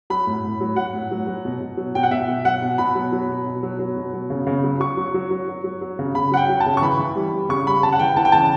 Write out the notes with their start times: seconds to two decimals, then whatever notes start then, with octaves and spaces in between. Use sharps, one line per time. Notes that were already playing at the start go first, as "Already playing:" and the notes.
0.10 F#3 B5
0.27 A2
0.44 A2
0.61 F#3
0.76 F#3 F#5
0.93 A2
1.11 F#3
1.27 F#3
1.45 B2
1.60 B2
1.77 F#3
1.95 B2 G5
2.03 F#5
2.11 B2 E5
2.28 B2
2.45 F#3 F#5
2.62 B2
2.78 B2 B5
2.95 F#3
3.12 F#3
3.29 B2
3.47 B2
3.63 F#3
3.79 F#3
3.97 B2
4.13 F#3
4.30 C#3
4.47 C#3
4.64 F#3
4.80 F#3 C#6
4.97 F#3
5.14 F#3
5.30 F#3
5.48 F#3
5.64 F#3
5.81 F#3
5.99 C#3
6.15 C#3 B5
6.31 F#3 F#5
6.37 G5
6.49 F#3
6.60 A5
6.66 C#3
6.77 C#6
6.82 E3 B5
6.99 E3
7.16 G3
7.33 G3
7.49 C#3 C#6
7.67 G3 B5
7.83 C#3 A5
7.92 F#5
7.99 E3 G5
8.16 E3 A5
8.25 G5
8.32 C#3 A5